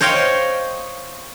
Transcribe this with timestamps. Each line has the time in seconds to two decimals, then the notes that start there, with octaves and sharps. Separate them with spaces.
0.01 C5 C#5 D#5 F5 G5